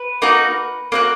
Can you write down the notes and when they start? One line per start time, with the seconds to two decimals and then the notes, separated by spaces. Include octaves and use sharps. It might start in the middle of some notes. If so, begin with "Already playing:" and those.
Already playing: B4
0.22 A#3 D#4 F#4
0.92 A#3 D#4 F#4